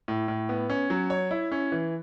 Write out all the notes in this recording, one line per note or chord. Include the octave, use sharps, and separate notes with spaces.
A2
A2
B3
C#4
F#3
C#5
E4
C#4
E3